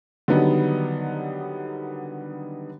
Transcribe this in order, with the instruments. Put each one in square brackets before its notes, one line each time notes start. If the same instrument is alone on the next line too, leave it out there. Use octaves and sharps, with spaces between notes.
[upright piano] D3 D#3 F#3 G3 B3 D#4